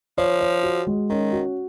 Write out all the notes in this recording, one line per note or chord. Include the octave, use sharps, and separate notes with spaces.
F3 C#5
C#5
F#4
G#3
D#3 C#4
F#4